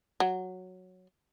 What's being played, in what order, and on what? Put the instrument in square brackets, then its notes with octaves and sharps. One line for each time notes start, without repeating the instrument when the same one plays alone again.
[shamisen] F#3